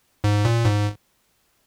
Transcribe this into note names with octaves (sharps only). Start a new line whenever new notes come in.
G#2
A#2
G#2